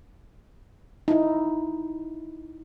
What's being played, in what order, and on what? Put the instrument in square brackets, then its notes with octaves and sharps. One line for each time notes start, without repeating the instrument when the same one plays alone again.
[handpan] D#4 E4